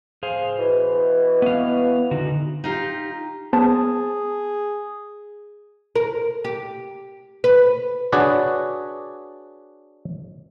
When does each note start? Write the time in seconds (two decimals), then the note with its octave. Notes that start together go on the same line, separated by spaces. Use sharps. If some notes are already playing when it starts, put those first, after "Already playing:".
0.23 G#4 C5 F5
0.58 B2 E3
1.42 B3 F5
2.11 D3 D#4 F#4
2.64 D#4 F4 G4
3.53 B3 G#4 C5 A5
5.95 A#4
6.44 G4
7.44 B4
8.12 D4 F#4 G#4 B4 C#5 D5